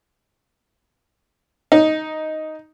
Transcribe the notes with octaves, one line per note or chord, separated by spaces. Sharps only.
D#4